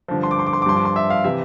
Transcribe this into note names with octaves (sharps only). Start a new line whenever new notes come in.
G2 D3 F3
C6
D6
C6
D6
C6
D6
G2 F3 C6
D6
C6
E5
F5
C3 E3 E5